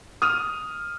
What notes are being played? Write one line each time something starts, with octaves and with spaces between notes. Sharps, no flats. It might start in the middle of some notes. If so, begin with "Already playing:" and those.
D#6 F6 D#7